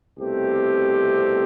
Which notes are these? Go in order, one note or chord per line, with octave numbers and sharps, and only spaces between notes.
C2 B2 A3 C4 G4